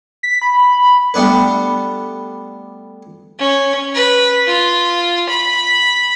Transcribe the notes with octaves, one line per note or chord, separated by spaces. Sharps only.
B6
B5
G3 A3 B3 D4 B4
C#4
B4
F4
B5